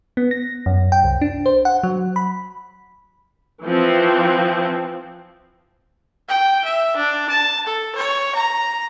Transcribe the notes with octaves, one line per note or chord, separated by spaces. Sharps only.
B3
A#6
F#2
G5
C2
D4
C5
F#5
F#3
B5
E3 F3 C4
G5
E5
D4
A5
A4
C#5
A#5